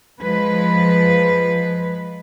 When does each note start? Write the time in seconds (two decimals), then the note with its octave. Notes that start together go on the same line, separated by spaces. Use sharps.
0.20 F3 G#3 B4